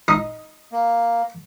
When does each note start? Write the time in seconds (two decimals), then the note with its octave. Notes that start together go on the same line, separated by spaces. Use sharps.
0.08 D#4 D#5
0.72 A#3